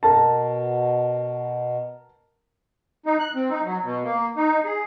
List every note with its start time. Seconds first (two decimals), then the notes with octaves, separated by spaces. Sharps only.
0.03 B2 A#4 A5
3.06 D#4
3.19 F#6
3.35 C4
3.50 D#4
3.64 F#3
3.84 B2
4.04 A#3
4.36 D#4
4.64 G#4